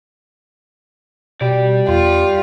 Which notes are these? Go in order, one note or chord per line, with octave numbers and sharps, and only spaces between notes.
B2 G4 D5
E2 F4